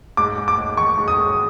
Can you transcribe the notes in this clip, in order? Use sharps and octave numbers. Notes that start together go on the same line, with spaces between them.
G#2 D6
G#3
D6
G#2
D#3 C#6
G#2
D#6
G#3